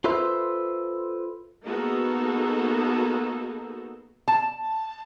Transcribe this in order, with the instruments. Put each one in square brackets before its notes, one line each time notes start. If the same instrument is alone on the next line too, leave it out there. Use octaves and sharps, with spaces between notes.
[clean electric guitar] F4 A4 B4 C5 E5
[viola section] A#3 B3 D#4 F#4 G#4 A4
[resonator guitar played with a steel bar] A5